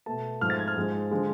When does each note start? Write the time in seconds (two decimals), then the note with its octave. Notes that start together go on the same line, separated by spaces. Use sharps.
0.06 B2 A3 A5
0.41 G#2 F3 A3 F6
0.50 A6
0.59 G#6
0.68 F6
0.76 G#2 F3 G#3
1.11 D3 F3 G#3